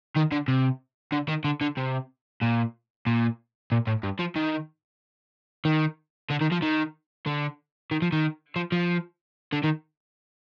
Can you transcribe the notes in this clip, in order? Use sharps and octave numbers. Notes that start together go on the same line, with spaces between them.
D#3
D3
C3
D3
D#3
D3
D3
C3
A#2
A#2
A#2
A2
G2
F3
D#3
D#3
D3
D#3
F3
D#3
D3
D#3
F3
D#3
F3
F3
D3
D#3